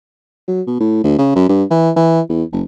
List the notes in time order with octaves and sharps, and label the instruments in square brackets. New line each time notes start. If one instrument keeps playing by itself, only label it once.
[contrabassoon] F#3
B2
A2
D2
C#3
F#2
G2
E3
E3
E2
F#1